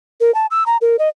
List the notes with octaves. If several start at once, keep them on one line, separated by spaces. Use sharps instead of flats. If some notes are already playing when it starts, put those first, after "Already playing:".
A#4
A5
E6
A#5
A#4
D#5